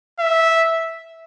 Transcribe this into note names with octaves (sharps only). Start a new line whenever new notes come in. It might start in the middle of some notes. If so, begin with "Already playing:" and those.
E5